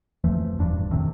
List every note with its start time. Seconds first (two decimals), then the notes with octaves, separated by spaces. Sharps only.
0.24 F2 E3 F3 A3
0.58 D#1 E2 G2 D4
0.91 F2 A2 C3 D#3